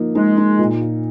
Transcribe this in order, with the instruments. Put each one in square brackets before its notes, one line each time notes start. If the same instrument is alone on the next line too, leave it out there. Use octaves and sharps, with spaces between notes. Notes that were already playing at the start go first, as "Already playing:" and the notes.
Already playing: [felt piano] F3 A#3 D#4
[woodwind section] G#3 [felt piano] D#4
[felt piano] D#4
A#2
F4